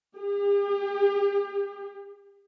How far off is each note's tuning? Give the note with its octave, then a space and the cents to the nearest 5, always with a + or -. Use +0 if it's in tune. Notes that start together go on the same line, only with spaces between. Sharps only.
G4 +45